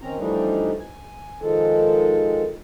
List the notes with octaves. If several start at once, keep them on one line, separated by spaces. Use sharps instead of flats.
D#3 C4 C#4 A#5
E3 F3 G3 A3 D4 D#4
G#5
D#3 F3 G#3 A4